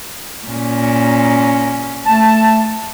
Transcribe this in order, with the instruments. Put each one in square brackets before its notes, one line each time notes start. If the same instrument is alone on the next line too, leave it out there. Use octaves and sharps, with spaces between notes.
[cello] A#2 C#4
[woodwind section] A3 A5